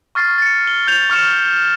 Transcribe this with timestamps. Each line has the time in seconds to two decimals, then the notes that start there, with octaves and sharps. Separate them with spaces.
0.15 C#6 F6 A6 C7
0.38 A6 C#7
0.67 G7
0.87 F6 G6 F7
1.10 C#6 F6 C#7 E7